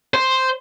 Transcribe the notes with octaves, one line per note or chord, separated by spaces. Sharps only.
C5